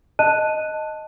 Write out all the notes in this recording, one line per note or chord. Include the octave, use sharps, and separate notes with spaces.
D#5 A5 F#6 D#7